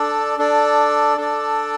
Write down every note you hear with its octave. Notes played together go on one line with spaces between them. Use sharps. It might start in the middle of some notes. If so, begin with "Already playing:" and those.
Already playing: D4 A4 D5
D4 A4 D5
D4 A4 D5